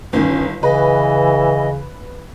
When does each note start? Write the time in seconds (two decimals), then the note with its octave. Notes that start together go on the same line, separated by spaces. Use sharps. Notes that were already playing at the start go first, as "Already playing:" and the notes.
0.13 G1 D#3 C#4
0.63 C#3 E3 B4 D#5